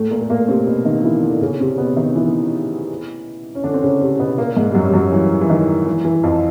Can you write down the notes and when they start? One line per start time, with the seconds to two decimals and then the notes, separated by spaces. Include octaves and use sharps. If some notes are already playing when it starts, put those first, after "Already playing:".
Already playing: A2 A3
0.11 A#2 A#3
0.21 A3
0.30 A#2 A#3
0.48 C3 C4
0.67 B2 B3
0.85 D#3 D#4
1.04 E3 E4
1.22 D3 D4
1.41 C#3 C#4
1.60 C3 C4
1.78 B2 B3
1.97 D#3 D#4
2.15 E3 E4
3.55 C#4
3.64 D3 D4
3.74 C4
3.82 C#3 C#4
4.01 C3 C4
4.19 B2 B3
4.38 A#2 A#3
4.56 G#2 G#3
4.70 G3
4.75 F#2 F#3
4.85 G3
4.93 F#2 F#3
5.12 E3
5.41 E3
5.50 D#3
5.86 E3
6.05 E3
6.23 F2 F3